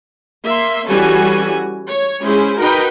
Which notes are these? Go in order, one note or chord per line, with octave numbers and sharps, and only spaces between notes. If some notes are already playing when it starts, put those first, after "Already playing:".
A#3 E5 C6
E3 G3 C#4 F#4 A4 G#5
C#5
G#3 C#4 E4 G#4 C5
D#4 F#4 A#4 B4 G5 B5